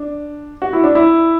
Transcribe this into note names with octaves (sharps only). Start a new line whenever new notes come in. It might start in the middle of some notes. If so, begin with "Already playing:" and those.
Already playing: D4
F#4
E4
D4
E4